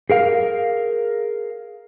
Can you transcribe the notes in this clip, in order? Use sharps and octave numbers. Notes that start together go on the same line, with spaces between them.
G#4 A#4 F5